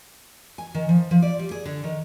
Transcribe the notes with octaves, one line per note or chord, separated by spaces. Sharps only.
G#5
D#3
F3
F3
D5
G3
G#4
D3
D#3